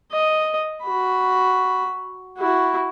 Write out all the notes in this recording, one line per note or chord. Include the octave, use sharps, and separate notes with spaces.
D#5
F#4 B5
E4 F#4